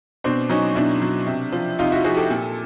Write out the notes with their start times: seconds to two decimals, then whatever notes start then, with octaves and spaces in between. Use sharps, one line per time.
0.24 B2 C4 D4
0.50 F#3 C#4 D#4
0.75 B2 D4 E4
1.02 F#3
1.27 C3
1.52 F3
1.79 C3 D#4 F4
1.92 E4 F#4
2.04 F3 F#4 G#4
2.17 G4 A4
2.30 A#2